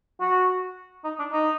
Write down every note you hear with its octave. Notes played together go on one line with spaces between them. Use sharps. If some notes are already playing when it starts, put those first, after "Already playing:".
F#4
D#4
D4
D#4